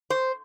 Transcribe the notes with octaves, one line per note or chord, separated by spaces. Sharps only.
C5